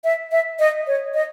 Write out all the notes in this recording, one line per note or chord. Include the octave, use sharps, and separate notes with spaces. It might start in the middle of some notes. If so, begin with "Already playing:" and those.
E5
E5
D#5
C#5
D#5